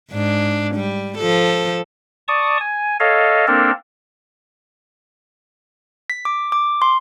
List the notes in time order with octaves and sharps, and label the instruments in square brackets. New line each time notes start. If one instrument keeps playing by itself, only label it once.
[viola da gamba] G#2 D4
G3
F3 A4
[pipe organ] D5 A5 C#6 D#6
G#5
A4 C#5 D#5 F5
A#3 C4 D4 A4 A#4
[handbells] B6
D6
D6
C6